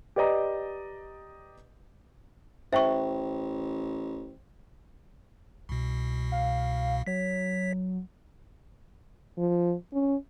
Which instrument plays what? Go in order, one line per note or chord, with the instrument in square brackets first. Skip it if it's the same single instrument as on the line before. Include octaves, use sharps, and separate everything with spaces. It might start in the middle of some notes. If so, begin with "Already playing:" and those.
[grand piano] G4 B4 D5 D#5 A#5
[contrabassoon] A1 [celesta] C5 G5 [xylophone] E5 C#6
[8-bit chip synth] C2 B2
[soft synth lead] F5
[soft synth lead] F#3 [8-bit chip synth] C#5 B6
[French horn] F3
C#4